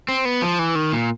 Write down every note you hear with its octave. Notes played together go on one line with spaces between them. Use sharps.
C4
B3
F3
E3
D#3
A#2